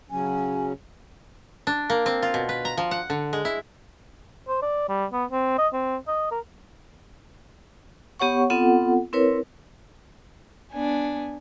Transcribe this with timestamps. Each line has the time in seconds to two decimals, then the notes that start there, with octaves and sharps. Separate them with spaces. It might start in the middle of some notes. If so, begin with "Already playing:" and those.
0.11 C#3 F#3 C#4 G#5
1.67 D4
1.90 A#3
2.06 C4
2.22 F4
2.34 B2
2.49 B4
2.65 A#5
2.77 F3
2.91 F#5
3.10 D3
3.33 G#3
3.45 E4
4.48 C5
4.62 D5
4.89 G3
5.13 B3
5.31 C4
5.58 D#5
5.73 C4
6.08 D#5
6.31 A#4
8.19 B3 G4 C#5 F#5 C#6
8.50 B3 C4 F4 A4 F#5
9.13 C4 E4 A#4 B4 C#5
10.72 B3 D4 G#5